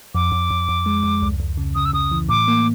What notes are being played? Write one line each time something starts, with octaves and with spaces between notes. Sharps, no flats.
F2 D6
F2
F2
F2
G#3
F2
C#2
C#2
C#3
C#3 D#6
E6
C#3 D#6
E3
A2 D6
A#3